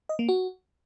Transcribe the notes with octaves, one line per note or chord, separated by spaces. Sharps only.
D#5
A#3
F#4